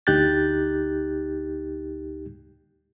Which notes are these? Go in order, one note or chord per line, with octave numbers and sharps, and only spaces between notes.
D2 D#4 G4 F#6 G6 A6